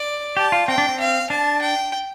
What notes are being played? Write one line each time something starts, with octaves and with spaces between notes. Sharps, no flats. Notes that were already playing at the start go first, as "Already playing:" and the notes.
Already playing: D5
G4 A5
F4
C4 G5
D4
C4
F5
D4 A5
G5